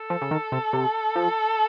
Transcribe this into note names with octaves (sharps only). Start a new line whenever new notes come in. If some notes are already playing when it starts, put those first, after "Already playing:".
Already playing: A4
F3
C#3
D#3
C3
C3
F3